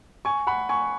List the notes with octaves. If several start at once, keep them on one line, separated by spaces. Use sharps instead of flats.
G#5 C#6
F#5 B5
G#5 C#6